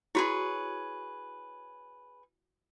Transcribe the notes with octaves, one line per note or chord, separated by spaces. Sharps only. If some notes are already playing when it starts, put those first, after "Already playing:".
E4 F#4 G#4 B4 C#5